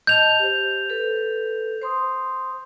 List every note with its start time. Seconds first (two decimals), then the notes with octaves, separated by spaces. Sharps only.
0.07 D#5 A5 G6 F7
0.39 G4 C5
0.90 A4 B4
1.82 C5 C6 D#6